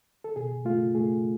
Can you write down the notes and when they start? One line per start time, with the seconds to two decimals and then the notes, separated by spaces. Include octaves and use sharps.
0.24 A4
0.36 B2 G#4
0.65 A3 F4
0.95 A3 G#4